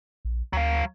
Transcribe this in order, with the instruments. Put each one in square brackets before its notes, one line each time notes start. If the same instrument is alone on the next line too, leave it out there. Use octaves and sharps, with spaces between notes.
[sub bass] A#1
[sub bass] D2 [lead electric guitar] F#3 F5